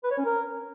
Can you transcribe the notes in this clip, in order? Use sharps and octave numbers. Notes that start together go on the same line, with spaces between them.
B4
C#5
C#4
A#4